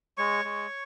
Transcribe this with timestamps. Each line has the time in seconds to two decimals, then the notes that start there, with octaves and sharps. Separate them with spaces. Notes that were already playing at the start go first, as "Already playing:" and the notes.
0.18 G#3 C#5 C#6
0.45 G#3